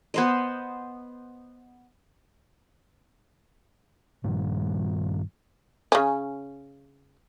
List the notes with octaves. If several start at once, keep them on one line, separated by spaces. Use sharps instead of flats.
B3 C5 D#5
G2 A#2 D#3 G3
C#3 C#4